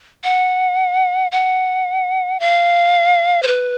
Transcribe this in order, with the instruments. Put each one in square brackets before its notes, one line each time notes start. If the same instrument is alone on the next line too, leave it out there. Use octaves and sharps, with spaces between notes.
[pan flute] F#5
F#5
F5
C5
B4